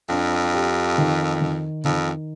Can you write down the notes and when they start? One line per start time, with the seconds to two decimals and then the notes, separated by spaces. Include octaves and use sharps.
0.09 F2 D4
0.54 G4
0.98 D#3
1.40 D#3
1.85 F2 D#3